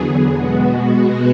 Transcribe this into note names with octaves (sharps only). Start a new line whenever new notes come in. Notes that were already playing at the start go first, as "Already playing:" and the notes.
Already playing: E2 D3 F#3 B3 G#4
B2 G#3 B3 F#4